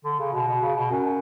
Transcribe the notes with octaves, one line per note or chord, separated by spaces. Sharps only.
D3
C#3
B2
B2
C#3
B2
F#2